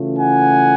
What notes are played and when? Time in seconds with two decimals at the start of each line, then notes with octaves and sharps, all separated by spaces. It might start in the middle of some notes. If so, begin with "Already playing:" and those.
Already playing: C#3 E3 A3 C#4 F4
0.19 F#5 G#5